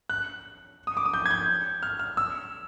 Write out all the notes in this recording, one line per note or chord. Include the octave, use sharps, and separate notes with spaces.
F#6
D#6
D6
D#6
G6
G#6
G6
F6
F6
E6